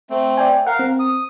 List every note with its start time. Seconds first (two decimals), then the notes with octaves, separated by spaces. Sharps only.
0.10 A3 C4
0.37 D5 G5 G#5
0.67 A#4 F5 F#5
0.79 C4
1.00 D#6